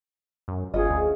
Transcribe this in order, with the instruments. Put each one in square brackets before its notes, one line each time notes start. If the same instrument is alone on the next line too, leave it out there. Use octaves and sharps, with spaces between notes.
[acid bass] F#2
[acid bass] G1 [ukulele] C#4 F4 D#5 [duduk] G#4
[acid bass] D2